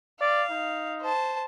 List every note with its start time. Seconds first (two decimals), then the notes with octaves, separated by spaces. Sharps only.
0.21 D5 F5
0.50 D#4
1.01 C5 A5